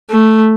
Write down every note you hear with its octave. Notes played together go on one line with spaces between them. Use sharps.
A3